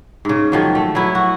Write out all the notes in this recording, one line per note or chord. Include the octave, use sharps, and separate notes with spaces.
G#2 C#3
D#3 F3 F#3
A3
F#3 B3 E4
F#4